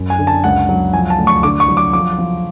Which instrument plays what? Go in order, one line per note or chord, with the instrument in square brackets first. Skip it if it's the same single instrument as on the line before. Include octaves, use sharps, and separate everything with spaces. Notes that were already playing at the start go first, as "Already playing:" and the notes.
Already playing: [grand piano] F#2
G#5
D3
A5
C#2 F#5
F#3
F3 G#5
A5
D2
C#6
D3 D6
C#6
F#3
D6
F3 D6
F3